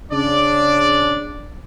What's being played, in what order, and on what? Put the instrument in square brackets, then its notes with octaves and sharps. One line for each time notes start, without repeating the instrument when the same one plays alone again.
[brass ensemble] C#3 D4 D5